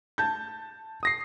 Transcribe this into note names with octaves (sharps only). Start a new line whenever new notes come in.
A5 G6
D#6 A#6 C7